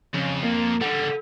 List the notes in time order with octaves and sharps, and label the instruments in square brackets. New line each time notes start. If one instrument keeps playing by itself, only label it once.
[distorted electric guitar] F2 [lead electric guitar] C#3
[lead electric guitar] A#3
[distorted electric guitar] D3 G3 [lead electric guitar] A4 F#5